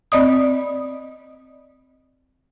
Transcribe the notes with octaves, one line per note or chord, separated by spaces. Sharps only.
C4 D5 D#5 D#6